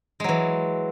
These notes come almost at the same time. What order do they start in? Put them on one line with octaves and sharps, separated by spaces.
G#3 F#3 E3